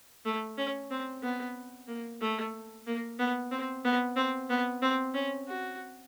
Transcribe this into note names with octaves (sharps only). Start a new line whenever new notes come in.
A3
C#4
C4
B3
A#3
A3
A#3
B3
C4
B3
C4
B3
C4
C#4
F#4